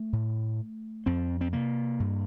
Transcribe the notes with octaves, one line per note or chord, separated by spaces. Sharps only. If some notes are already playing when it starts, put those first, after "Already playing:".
Already playing: A3
A2
F2 C4
C4
C3 A#3
G2